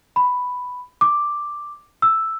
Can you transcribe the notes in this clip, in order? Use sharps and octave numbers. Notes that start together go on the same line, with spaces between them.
B5
D6
E6